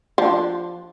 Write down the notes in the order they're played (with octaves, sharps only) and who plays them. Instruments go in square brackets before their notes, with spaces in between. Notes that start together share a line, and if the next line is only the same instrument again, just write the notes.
[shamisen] F3 D4